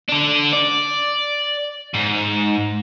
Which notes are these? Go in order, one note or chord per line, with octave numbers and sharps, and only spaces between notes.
D4 A4
D5
G#2